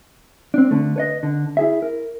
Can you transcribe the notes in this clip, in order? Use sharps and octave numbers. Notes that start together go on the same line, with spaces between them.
C4 D4
D3 A3
B4 C#5 D#5
D3
E4 G#4 E5
A#4